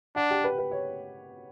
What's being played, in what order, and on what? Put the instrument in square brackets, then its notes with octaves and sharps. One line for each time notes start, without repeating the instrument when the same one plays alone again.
[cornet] D4 [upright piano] F#5
[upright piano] G4
B4
B4
C#5